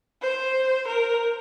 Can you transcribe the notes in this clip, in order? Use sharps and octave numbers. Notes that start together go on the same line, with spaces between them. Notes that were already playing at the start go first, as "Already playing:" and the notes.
C5
A#4